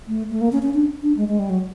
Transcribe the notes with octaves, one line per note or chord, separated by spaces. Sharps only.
A3
A3
A#3
C#4
C#4
D4
D4
G#3
G#3
G3
F#3